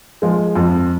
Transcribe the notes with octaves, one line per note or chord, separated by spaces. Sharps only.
F3 G#3
F2